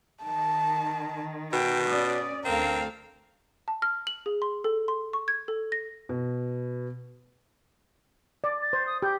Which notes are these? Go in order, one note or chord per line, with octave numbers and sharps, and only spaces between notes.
D#3 A5
B2 G5
C#4 D5 D#6
D2 C4 A4 A#4 F5
A5
F6
F#7
G#4
C6
A4
C6
C#6
G#6
A4
A#6
B2
D5
A6
C5
D#6
G4 G6